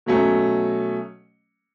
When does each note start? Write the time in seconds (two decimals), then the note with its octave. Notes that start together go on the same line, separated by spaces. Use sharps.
0.06 B2 F#3 A3 C#4